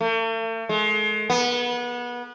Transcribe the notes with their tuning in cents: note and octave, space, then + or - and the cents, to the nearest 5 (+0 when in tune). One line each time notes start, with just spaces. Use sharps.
A3 +45
G#3 +35
B3 -25